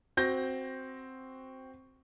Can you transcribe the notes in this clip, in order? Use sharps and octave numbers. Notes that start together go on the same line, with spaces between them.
C4 F#4 G6 A#6